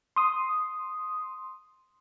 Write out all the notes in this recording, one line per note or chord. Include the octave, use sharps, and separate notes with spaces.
C6 D#6